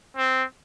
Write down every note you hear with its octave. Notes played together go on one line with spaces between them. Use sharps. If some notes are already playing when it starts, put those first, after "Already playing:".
C4